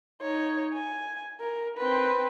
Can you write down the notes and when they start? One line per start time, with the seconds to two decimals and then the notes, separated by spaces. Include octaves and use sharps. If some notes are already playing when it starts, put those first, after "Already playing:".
0.22 D#4 C#5
0.74 G#5
1.40 A#4
1.78 C4 B4